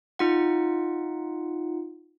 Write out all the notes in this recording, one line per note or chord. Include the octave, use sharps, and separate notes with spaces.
D#4 F4 F#5